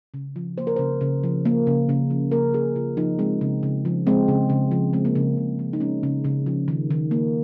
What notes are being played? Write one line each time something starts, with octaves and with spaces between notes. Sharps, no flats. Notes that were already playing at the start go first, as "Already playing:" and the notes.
C#3
F3
A#3 C5
A#4
C#3 C5
C#3
F3
A#3
C#3
C#3
F3
A#3 A#4
C#3 G#4
C#3 F4
F3 D#4
G#3 C4
C#3
C#3
F3
G#3 C4
C#3
C#3
F3
G#3 C4
A#3
C#3 C4
C#3
F3
D#4
G#3 C#4
C#3
C#3
F3
D#3
D#3
A#3